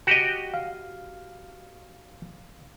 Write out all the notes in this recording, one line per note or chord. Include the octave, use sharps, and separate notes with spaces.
F#4 G4 D#5
F5